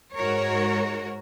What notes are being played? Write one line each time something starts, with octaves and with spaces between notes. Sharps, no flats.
G#2 F#4 A#4 C#5